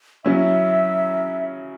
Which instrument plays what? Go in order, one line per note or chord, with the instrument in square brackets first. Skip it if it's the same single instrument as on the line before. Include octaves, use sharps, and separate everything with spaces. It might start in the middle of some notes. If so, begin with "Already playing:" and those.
[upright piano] C#3 F#3 C#4 E4 [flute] E5